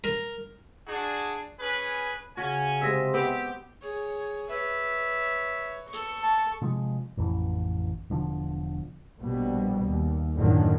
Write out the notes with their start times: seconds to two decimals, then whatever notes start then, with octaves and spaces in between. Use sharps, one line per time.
0.04 A#4
0.87 D4 F#4 G#4
1.59 C#4 G#4 B4
2.37 C#3 C#4 F#4 G#5
2.81 C3 G#3 D#5 E5
3.14 B3 C4 G4
3.82 G#4 C#5
4.50 B4 C#5 E5
5.88 A4 C#6
6.22 A5
6.62 C3 F3 G#3
7.17 A1 F2 E3
8.10 E1 D3 F3
9.20 A#1 B2 G3
9.88 D#2
10.37 F#1 A2 D3 D#3 F#3